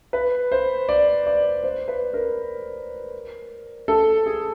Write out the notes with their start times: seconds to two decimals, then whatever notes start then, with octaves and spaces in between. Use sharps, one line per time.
0.13 B4
0.52 C5
0.89 D5
1.26 D5
1.64 C5
1.88 B4
2.14 A#4
3.88 A4
4.26 G#4